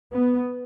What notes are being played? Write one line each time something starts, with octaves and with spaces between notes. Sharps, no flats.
B3